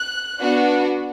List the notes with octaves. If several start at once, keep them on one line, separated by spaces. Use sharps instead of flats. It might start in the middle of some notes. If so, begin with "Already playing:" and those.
Already playing: F#6
B3 D4 F#4